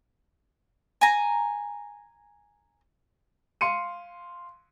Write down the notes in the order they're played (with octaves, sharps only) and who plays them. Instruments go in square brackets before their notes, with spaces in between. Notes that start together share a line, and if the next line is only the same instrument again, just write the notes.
[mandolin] G#5 A#5
[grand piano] F5 C6 C#7 D#7